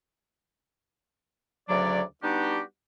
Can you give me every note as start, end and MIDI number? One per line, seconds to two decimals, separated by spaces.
1.69 2.02 38
1.69 2.02 49
1.69 2.02 54
1.69 2.02 74
2.23 2.61 55
2.23 2.61 59
2.23 2.61 62
2.23 2.61 63
2.23 2.61 66
2.23 2.61 67